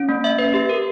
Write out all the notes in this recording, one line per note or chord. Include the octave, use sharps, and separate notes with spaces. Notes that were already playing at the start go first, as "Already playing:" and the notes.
Already playing: C#4
A#3
E5
B4
G4
A#4